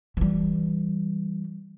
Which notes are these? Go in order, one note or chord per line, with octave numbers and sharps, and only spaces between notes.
E3 G3